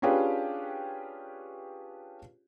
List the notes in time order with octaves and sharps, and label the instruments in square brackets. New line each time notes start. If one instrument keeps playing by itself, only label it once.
[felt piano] C#4 D4 F4 G4 G#4 B4